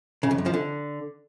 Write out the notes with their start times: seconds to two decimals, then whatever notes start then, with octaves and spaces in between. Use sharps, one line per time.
0.23 C#3
0.31 F2
0.38 F#2
0.46 F3
0.54 D3